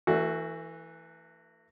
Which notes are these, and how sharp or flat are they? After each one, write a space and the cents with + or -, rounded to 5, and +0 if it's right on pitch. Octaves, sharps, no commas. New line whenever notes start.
E3 +0 A3 +35 F#4 +0